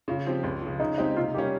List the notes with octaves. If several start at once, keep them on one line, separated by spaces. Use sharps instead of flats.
C#3 F4
F3 C4 G4
C#2
C#3 F3
C#3 D#4
G#3 C4 D#4 G4
C3 F4
G3 A#3 C#4 G4